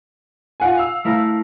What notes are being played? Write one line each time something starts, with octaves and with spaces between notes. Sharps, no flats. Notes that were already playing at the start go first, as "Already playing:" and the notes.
F4 F#5 G#5
F5 E6
A3 E4 A#4